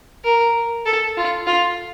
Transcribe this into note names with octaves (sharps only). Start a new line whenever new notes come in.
A#4
A4
F4
F4